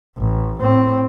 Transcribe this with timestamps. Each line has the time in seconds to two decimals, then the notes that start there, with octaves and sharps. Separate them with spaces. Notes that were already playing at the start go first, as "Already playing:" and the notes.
0.18 A1
0.61 A2 C4